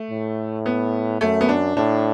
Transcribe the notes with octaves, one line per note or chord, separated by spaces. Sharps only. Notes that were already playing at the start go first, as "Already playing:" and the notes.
Already playing: A3
A2
B3
F#2 A3
B3
D4
A2 D4